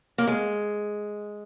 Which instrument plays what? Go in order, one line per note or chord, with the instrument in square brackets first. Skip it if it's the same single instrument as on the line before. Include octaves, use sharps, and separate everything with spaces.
[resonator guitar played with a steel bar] A#3
G#3